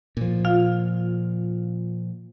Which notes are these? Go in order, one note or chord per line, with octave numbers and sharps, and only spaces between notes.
A#2 F3
F4 F5